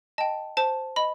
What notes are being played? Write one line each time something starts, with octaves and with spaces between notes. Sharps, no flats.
D#5 G5 A5
C5 A5
D#5 B5